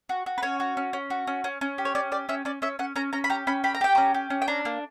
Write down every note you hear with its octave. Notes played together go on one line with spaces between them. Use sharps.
F#4
F#4
B4
C#4 C#5
F#4
C#4
C#4
F#4
C#4
C#4
C#4
G4
C#5
C#4 D5
G4 D5
C#4 E5
C#4 D5
C#4 E5
C#4 F#5
C#4 A#5
C#4 A#5
B5
G4 A#5
C#4 B5
G4 B5
A#5
G4 G5
C#4 A#5
G4
C#4
G5
D4 A#5
A#3